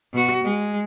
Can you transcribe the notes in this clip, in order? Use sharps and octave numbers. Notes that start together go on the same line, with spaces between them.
B2 F#4
G#3